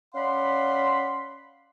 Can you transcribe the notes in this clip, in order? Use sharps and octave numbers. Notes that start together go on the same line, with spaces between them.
C#4 D5 F5 F#5 B5 C6